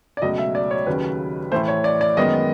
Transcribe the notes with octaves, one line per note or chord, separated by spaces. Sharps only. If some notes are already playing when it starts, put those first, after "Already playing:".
D5
C#2 B2 F#3 A3 D#5
E5
D5
C#5
D#2 C#3 F#3 B4
A2 E3 A3 C5
C#5
D5
D5
F#2 D#3 G#3 B3 D#5